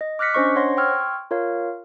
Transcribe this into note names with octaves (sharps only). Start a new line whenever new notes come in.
D#5
D6 F6 F#6 A#6 B6 C#7
C#4 D4 C5 D#5 C#6
C5 C#5 F#5 C6 A#6
G5 C6 C#6 E6 F6 G#6
F4 A#4 C#5 F5